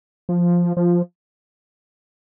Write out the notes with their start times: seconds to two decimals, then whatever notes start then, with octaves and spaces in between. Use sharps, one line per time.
0.29 F3
0.77 F3